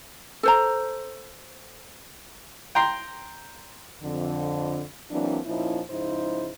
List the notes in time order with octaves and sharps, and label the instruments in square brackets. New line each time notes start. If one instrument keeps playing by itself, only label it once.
[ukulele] A4 C5 A#5
[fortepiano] G5 A#5 C6
[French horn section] F2 D3
E3 F#3 A#3 C4 D4
A#2 F3 C#4 D#4 E4
G#2 C#3 F3 D#4 E4 C5